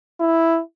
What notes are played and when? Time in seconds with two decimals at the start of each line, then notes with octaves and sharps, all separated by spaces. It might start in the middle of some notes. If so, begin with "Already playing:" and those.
0.21 E4